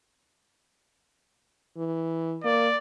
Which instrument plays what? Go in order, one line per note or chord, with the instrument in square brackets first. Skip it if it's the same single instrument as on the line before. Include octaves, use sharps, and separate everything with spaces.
[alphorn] E3
[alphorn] A#3 [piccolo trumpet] D5